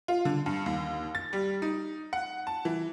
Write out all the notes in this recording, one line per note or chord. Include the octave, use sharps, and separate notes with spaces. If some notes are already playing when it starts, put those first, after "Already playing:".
F4
D3
G2
D#2
A6
G3
D#4
F#5
A5
E3